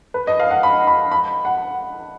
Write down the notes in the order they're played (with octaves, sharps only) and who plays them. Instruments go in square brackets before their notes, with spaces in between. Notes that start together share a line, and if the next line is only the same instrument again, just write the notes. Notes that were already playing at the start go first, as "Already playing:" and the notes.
[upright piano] B4
D#5
F5
F#5
B5
B5
B5
F#5